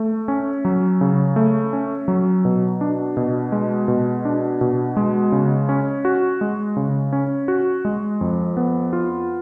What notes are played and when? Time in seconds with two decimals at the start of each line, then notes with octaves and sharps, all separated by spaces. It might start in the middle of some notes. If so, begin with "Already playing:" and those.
Already playing: A3
0.28 C#4
0.65 F#3
1.01 C#3
1.36 A3
1.73 C#4
2.08 F#3
2.45 B2
2.81 D4
3.17 B2
3.52 G#3
3.88 B2
4.25 D4
4.61 B2
4.97 G#3
5.32 C#3
5.69 C#4
6.05 F#4
6.41 G#3
6.77 C#3
7.13 C#4
7.48 F#4
7.85 G#3
8.21 F2
8.57 B3
8.93 F4